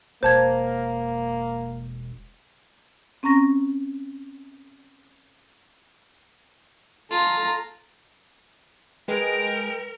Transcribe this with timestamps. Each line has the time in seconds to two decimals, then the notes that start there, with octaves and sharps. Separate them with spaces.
0.23 E1 A#3 C5 A5 G#6
3.23 C4 C#4 A#5 C#6 A#6
7.11 F4 A4 A#5
9.08 G#3 A#4 B4 G5